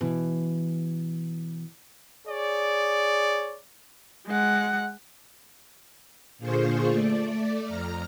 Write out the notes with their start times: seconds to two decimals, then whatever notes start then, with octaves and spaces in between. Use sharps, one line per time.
0.01 B2 E3
2.27 G#4 C#5 D5
4.27 G#3 F#5
6.38 A#2 D3 F4 G#4 C5 C#6
6.89 A3 D5
7.65 F2 A#5 F6